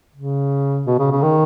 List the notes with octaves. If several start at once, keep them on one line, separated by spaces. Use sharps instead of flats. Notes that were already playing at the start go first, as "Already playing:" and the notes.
C#3
B2
C#3
C#3
D#3